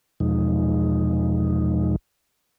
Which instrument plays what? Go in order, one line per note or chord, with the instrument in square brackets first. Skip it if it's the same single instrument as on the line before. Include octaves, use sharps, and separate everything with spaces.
[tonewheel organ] E2 B2 F3 G#3 D#4